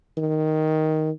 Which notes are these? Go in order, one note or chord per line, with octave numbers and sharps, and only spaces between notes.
D#3